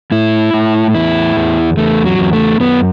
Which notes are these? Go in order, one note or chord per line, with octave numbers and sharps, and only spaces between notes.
A2 E4
A2
E2 E4
E2
E2 A3
F#3
E2
A3
F#2 B3